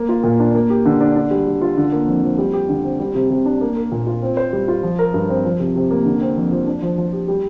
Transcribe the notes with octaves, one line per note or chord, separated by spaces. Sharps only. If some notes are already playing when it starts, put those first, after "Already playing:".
Already playing: A#3
F4
A#2
D4
A#3
G4
D3
D4
D4
G3
G3
F4
D3
A#3
F2
F3
G3
G4
D3
C4
G3
C3
C3
D4
A#3
A#4
A#2
F4
C4
C5
G3
F4
F3
A#4
G2
C4
F3
C3
C3
A#3
D3
C4
F2
F3
D4
F3
F3
G4
G3